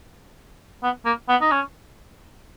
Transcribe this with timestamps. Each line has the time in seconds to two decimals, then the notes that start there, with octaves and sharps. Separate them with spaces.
0.83 B3
1.05 A#3
1.29 B3
1.41 D#4
1.51 C#4